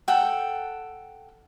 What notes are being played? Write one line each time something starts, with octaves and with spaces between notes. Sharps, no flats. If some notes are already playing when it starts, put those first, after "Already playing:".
A4 F#5 G5